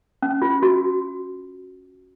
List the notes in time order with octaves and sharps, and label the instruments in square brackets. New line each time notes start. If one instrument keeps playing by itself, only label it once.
[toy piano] C#4
F4
F#4